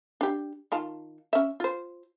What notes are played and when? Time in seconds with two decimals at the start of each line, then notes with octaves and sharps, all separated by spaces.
0.21 D4 G4
0.72 D#3 F4 A5
1.33 C#4 E5
1.60 F4 C5